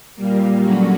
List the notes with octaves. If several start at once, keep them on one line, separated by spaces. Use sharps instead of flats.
A#2 G3 A#3
D3 F#3 C#4 F#4